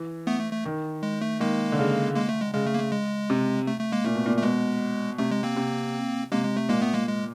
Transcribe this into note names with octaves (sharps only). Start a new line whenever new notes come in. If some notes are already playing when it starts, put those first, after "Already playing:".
Already playing: E3
A3 B3
A3
A3
D#3
G#3
A3
D#3 G#3 A#3
D3
C#3
G#3 A#3
A3
G#3
C#3 G#3
A3
A#3
A3
G#3
C3
A3
A3
G#3 A#3
A#2 A3
B2
A#2
A3
B2 G#3
C3 A3
G#3
A#3 C4
C3
C3 G#3 A#3
G#3
A3
A#2 G#3 A#3
A3 B3
G#3 A#3
G#3